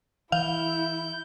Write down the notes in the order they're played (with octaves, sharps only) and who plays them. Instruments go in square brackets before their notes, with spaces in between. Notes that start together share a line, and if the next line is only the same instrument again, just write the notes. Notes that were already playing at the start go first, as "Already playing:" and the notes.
[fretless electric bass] E3 [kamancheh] E4 [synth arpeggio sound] F5 [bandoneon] G6